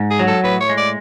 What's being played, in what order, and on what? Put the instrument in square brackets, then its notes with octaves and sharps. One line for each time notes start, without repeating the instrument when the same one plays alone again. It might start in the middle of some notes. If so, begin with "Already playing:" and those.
Already playing: [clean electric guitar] G#2
[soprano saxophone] G#4
[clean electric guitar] F#3
[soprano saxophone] A4
[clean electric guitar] A2 [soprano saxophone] B4
[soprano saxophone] C#5
[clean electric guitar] G#3
[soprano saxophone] D5